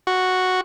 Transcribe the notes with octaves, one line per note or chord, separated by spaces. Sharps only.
F#4